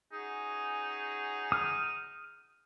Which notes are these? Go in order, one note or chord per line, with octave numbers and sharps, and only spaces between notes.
C#4 D#4 F#4 G#4
D#6 F6